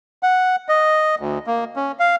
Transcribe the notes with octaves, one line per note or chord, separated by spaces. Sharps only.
F#5
D#5
D2
A#3
C#4
F5